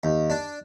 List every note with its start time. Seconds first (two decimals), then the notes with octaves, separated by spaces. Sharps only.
0.03 D#2
0.30 D4